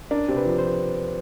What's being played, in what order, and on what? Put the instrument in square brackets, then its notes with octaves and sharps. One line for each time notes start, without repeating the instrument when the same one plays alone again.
[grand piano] D4 [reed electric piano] A#4
[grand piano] C3 [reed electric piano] C5
[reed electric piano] B4
[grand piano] F3
[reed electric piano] C5